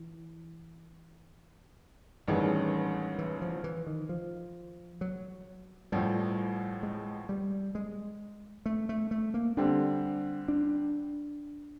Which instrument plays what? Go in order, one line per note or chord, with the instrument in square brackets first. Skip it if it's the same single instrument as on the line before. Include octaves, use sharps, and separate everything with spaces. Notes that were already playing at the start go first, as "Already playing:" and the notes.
Already playing: [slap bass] E3
[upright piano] A1 G2 D#3 G#3 C#4 [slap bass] E3
[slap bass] E3
F3
E3
D#3
F3
F#3
[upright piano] A1 A2 F3 [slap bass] G3
[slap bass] G#3
G3
G#3
A3
A3
A3
A#3
[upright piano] D3 G3 C4 [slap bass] D4
[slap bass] D4